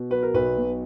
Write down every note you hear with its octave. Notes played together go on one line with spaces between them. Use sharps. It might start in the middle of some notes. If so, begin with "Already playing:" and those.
Already playing: B2
F#3 B4
A#4
B1 B4
B2